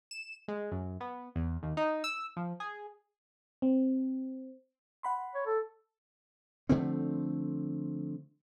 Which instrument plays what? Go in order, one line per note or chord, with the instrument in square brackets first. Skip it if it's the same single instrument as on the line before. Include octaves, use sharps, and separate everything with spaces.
[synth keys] E7
G#3
F#2
B3
E2
D#2
D#4
E6
F3
G#4
[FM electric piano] C4
F#5 B5 C6
[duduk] C#5
A4
[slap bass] D3 F3 A3 C4